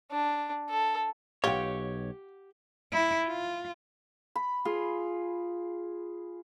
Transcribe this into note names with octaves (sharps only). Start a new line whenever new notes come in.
D4
A4
B1 F4 G4 C#5 F#5 G5
E4
F4
B5
F4 G#4